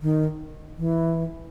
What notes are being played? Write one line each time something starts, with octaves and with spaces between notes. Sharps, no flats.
D#3
E3